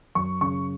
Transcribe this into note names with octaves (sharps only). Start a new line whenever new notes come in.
F#2 C#6
C#3 C#6